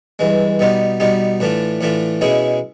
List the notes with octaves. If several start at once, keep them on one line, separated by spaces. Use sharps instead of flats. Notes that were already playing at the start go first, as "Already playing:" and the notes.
G2 E3 G#3
B2 G3 B3 D#4 G4
B2 G3 B3 D#4 G4
A2 E3 A3 D4 F4
A2 E3 A3 D4 F4
B2 G#3 C#4 E4 G#4